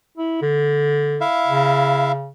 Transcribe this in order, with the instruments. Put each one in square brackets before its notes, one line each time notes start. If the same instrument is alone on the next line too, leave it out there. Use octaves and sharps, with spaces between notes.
[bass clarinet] E4
D3
[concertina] E4 E5 F5
[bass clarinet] C#3